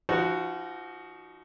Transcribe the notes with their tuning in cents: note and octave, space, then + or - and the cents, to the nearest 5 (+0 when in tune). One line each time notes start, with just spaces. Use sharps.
F3 -30 D#4 +0 F#4 +0